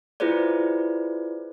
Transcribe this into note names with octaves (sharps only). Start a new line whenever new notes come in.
E4 F4 G#4 B4 C5 D5